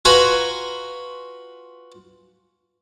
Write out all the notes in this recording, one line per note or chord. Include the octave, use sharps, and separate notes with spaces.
F4 F#4 B4 G#5 A#5 B5